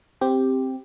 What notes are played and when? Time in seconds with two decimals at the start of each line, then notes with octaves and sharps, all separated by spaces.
0.21 C4 G4